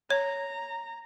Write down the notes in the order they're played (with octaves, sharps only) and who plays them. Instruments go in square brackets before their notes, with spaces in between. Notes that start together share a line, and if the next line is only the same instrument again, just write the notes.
[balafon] C#5 [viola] A#5